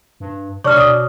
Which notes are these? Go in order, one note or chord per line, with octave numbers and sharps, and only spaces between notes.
G2
C3 D4 C#5 C#6 D6 F6
B2 D#6